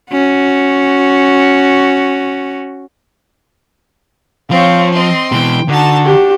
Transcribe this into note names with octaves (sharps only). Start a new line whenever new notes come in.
C#4 F#4
F3 C4 C#5 F5
C4 D#5 C6
B2 E3 G5
D3 D4 D#4 F#4 A5
D4 G4